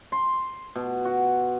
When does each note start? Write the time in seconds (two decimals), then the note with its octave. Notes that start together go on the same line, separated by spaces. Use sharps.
0.12 C6
0.76 B2
1.05 F#4